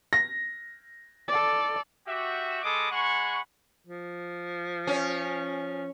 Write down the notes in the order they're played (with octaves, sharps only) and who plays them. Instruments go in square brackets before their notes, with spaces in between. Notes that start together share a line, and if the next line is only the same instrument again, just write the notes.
[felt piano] A#6
[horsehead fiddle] A4 D5
[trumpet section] F#4 G4 E5
G#3 A4 D#5 B5 D6 D#6
G#3 F#5 G#5 B5 C#6
[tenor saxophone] F3
[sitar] C#4